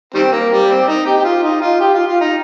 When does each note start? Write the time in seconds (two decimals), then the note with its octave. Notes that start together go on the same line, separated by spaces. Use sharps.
0.14 D#3 G3 C4
0.32 A#3
0.52 G3
0.69 C4
0.88 D#4
1.06 G4
1.18 G4
1.24 F4
1.43 D#4
1.62 F4
1.80 G4
1.94 F4
2.07 F4
2.21 D#4